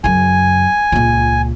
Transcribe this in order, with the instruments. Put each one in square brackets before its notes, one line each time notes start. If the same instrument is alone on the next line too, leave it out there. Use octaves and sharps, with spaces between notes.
[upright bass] F#2 C#3 [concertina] G#5
[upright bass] C#2 A#2